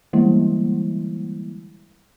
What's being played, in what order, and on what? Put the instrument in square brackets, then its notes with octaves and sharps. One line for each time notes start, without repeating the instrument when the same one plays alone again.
[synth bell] D3 E3 G3 G#3 A#3 E4